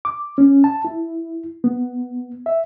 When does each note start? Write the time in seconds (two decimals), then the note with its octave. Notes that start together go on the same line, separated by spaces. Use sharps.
0.05 D6
0.38 C#4
0.64 A5
0.85 E4
1.64 B3
2.46 E5